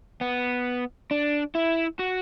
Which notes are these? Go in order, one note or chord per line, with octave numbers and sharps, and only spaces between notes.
B3
D4
E4
F#4